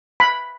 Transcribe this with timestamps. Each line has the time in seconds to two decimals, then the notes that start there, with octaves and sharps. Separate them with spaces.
0.20 B5